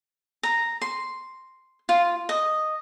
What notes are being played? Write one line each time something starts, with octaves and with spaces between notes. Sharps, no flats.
A#5
C6
F4
D#5